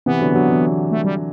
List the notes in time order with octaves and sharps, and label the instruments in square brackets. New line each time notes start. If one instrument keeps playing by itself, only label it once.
[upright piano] C3 E3 [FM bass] B3
[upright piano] D3 F#3
D3 F#3
C3 E3
[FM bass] A3
G3